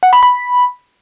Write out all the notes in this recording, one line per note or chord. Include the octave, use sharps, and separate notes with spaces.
F#5
B5
B5